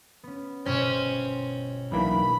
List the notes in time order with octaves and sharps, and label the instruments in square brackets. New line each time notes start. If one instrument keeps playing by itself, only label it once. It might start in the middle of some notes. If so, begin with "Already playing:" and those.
[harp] B3 C#4
[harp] G1 B2 [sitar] C4 C#4
[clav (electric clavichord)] B1 E3 A#3 [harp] D4 [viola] B5